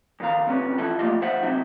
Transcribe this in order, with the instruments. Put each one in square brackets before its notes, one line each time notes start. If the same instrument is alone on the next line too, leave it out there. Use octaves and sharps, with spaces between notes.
[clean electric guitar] F2 D#3 F5 A#5
F2 C3 G3 B3 C#4
E3 F3 E4 A4
F3 G3 A3 A#3 F4 D#5
D2 F3 C5 E5 F#5
G#2 C3 F#3 D#4 E4